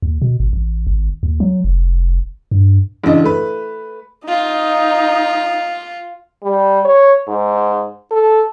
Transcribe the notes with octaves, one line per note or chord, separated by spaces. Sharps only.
D#2
B2
G#1
A1
G#1
D#2
F#3
F1
G2
A1 C#3 D4 D#5
A3 B4
D#4 F4
G3
C#5
G#2
A4